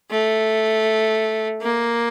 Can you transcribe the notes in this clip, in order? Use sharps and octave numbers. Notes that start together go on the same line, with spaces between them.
A3
A#3